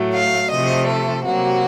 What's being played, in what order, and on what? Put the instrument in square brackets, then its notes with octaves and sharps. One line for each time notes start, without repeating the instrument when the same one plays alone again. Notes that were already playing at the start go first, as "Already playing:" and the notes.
Already playing: [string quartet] A2 F#3 A3
F5
C3 F3 A3 D#5
A4
C3 F#3 A#3 F#4